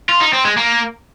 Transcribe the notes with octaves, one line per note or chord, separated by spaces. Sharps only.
F4
D#4
C4
G#3
A#3